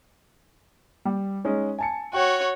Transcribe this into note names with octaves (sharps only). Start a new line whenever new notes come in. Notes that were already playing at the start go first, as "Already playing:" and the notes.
G3
G#3 C#4 D#4
G#5 A5 C#7
F#4 C#5 G5